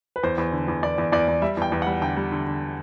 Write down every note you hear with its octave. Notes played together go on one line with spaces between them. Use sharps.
B4
E2 C5
E2
D3
E2
E2 D5
E2
E2 D5
E2
G3 E5
E2 G5
E2
F#5
G3
D3 G5
G3
D3
D3